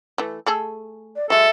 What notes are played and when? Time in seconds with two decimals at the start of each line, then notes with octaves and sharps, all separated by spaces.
0.18 E3 A3
0.46 A3 G#4 A4
1.16 D5
1.30 F#3 G#3 A4 E5